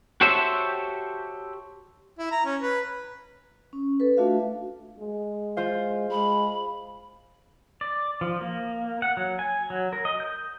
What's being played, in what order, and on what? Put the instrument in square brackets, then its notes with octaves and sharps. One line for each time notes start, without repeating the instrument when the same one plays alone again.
[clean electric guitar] F#4 G4 A4 C5 C#5 E5
[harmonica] E4
A#5
C#4
B4
[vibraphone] C#4
A4 B4
A3 D4 F4 F#4 E5 F5
[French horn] G#3
[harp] F4 C5 F5
[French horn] G#3 [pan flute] B5
[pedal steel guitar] D5
F3
A#3
F#5
F#3
G#5
F#3
A#4
D#5
G6